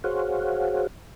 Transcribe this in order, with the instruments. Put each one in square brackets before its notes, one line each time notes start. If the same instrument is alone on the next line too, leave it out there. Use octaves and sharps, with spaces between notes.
[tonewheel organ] F#4 G#4 C5 C#5 F5 F#5